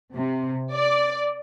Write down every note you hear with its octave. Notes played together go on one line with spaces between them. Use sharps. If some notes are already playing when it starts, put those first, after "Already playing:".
C3
D5